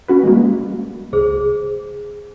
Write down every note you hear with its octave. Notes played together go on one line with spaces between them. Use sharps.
C#4 F#4 B4
G3 G#3 A#3
C#2 G#4 C5